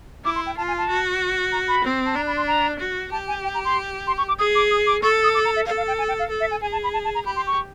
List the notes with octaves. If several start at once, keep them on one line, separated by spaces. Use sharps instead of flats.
E4 D6
C6
G5
F4 A5
G#5
A5
F#4
A#5
B5
C4
A5
D4 A#5
B5
C6
A#5
F#4
G4 A5
G#5
G5
A#5
C6
C6
C#6
D6
G#4 D#6
D6
D#6
D6
A4 C#6
D#6
D6
A#5
E5
A4 F5
F5
G5
G#5
G5
F5
A4
E5
G#5
G#4 G#5
A5
B5
A5
A5
A#5
G4 B5
C6
C#6